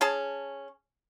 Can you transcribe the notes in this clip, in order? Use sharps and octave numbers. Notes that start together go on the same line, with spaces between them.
C#4 G#4 A5